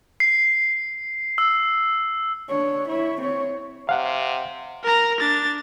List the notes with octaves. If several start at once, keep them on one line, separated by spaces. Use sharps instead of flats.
C7
E6
D4 C#5
E4 C#5
C4 C#5
C3 F5 F#5
A#4 A#5
D4 A6